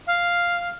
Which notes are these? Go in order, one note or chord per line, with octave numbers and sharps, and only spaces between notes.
F5